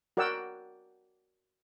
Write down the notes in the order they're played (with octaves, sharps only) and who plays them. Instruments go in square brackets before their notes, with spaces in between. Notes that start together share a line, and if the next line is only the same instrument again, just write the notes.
[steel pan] F#4 A#4 D5 F#5 G5 E6